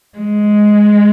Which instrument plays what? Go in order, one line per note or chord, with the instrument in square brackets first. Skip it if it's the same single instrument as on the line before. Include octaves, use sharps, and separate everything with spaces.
[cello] G#3